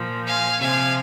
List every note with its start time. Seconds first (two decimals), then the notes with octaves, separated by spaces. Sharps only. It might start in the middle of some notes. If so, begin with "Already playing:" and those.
Already playing: A#2 F3
0.26 F5 G#5
0.60 C3 F3 F5 G#5